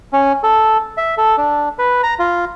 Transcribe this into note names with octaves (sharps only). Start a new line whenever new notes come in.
C#4
A4
E5
A4
D4
B4
A#5
F4